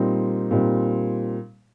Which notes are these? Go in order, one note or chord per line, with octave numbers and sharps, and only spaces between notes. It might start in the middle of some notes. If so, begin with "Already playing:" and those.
Already playing: A#2 G3 C4 D#4
A#2 G3 C4 D#4